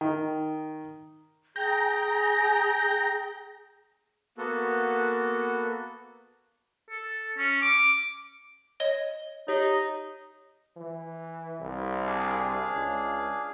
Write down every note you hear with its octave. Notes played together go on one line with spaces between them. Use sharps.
D#3
G#4 G5 A#5
A#3 B3 F#4 A4
A4
C#4
D6
C#5 D#5 G7
D#4 G4 C#5
E3
C2
D4 G#4 F5
C#2